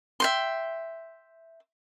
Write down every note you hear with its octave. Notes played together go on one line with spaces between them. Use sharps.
E5 G5 C6